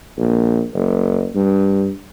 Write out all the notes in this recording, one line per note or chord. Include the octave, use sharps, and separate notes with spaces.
A#1
F#1
G2